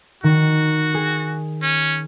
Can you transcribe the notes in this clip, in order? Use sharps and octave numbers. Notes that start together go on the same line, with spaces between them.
D#3 F#4
G#4
C#4